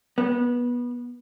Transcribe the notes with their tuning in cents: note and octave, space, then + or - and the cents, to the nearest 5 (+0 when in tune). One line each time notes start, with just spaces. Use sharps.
B3 -20